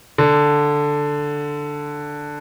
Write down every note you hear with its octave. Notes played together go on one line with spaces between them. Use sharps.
D3